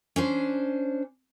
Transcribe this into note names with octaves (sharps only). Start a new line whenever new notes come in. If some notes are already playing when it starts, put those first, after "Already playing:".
C#4 D4 C5